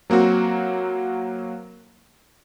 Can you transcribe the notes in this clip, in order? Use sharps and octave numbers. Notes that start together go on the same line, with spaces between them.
F#3 A#3 C4 F#4